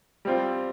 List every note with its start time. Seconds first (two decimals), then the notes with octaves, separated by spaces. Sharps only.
0.25 G3 C4 F4